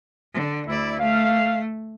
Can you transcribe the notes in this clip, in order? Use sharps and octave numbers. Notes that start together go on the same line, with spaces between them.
D3
D2 E4 D5
A3 F5